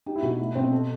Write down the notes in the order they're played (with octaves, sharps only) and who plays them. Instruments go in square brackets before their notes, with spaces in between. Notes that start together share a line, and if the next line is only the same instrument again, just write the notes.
[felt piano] D#4 [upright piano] G4
[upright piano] E4
[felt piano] B2 [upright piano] F#4
[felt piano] A3 [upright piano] E4
[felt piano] B2 [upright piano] C4
[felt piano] A4